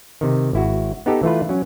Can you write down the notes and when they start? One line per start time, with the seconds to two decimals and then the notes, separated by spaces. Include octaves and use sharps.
0.21 C3 D#3
0.53 G#1 E4 F#4
1.06 B3 D#4 G4 A4
1.23 E3 A3 F4 B4
1.49 F#3 C#4